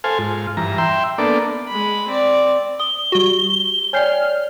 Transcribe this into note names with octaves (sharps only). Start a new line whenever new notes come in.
A4 C5 F5 G#5
G#2 F4
G2 E3 A#5
E5 G5 C6
A#3 B3 D4 A4 D5
G#3 B5
C4 D5
D#6 G7
G3 F#4 G4
C#5 D5 G5 G#5 F6 G6 C7